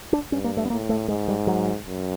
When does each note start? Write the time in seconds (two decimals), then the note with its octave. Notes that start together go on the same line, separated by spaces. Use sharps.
0.13 D4
0.32 G2 C#4
0.44 A#3
0.57 A3
0.66 B3
0.70 A2 A#3
0.89 A3
1.08 G#2 G#3
1.28 G3
1.47 F#3
1.86 F#2